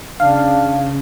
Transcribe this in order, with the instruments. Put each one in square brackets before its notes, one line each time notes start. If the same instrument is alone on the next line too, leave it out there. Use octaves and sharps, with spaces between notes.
[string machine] C#3 [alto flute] D4 [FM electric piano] F5